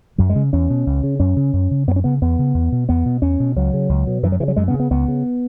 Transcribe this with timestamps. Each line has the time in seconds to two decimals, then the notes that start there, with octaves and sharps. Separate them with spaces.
0.18 F#2 F#3
0.30 G#3
0.35 C#3
0.53 E2 C#4
0.70 B2
0.86 C#2
1.03 C#3
1.20 F#2 C#4
1.36 C#3
1.53 F#2
1.71 C#3
1.87 F#2 B3
1.96 C#4
2.04 C#3 B3
2.22 E2 B3
2.39 C#3
2.54 E2
2.72 B2
2.89 E2 B3
3.05 B2
3.22 E2 C#4
3.40 B2
3.56 C#2 F#3
3.73 C#3
3.89 C#2
4.07 B2
4.23 F#2 E3
4.32 F#3
4.40 C#3 E3
4.48 F#3
4.56 F#2 G#3
4.68 B3
4.74 C#3
4.80 B3
4.91 C#2 B3
5.08 C#3